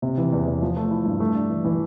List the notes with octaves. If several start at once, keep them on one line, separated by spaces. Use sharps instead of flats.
C3
E3
E2
E2
F3
A3
E4
G2
A3
D4
E3
E3